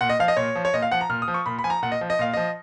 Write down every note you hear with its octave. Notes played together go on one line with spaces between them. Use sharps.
A#2 F#5
D#5
F3 F5
D#5
A#2 C#5
F3
C#5
A#2 D#5
F5
F3 F#5
A#5
A#2 F6
D#6
F3
C#6
A#2 B5
B5
F3 G#5
A#5
A#2 F#5
D#5
F3
D#5
A#2 F5
F3 D#5